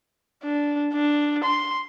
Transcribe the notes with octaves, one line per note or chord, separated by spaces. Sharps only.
D4
D4
C6